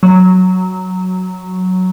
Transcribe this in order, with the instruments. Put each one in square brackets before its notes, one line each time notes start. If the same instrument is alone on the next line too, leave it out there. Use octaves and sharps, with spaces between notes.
[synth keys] F#3